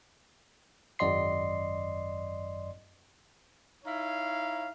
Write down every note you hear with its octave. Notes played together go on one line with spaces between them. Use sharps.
G#1 F#2 D5 D#5 C6 C7
D#4 E4 C#5 F5